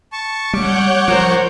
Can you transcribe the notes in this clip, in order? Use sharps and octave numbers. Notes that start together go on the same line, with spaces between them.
A5 C#6
G3 C#5 F#5 C#6 D6 G6
F3 A#4 C5